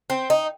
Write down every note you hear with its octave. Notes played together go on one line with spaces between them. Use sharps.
C4
D#4